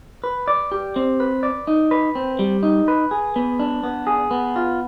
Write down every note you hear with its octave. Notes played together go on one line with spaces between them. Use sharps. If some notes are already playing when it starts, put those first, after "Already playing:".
B4
D5
G4
C4
B4
D5
D#4
B4
C4
G3
D#4
B4
G#4
B3
D4
B3
G#4
B3
F4